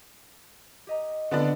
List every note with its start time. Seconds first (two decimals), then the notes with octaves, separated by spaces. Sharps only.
0.87 G4 D#5 A#5
1.31 D3 B3 D4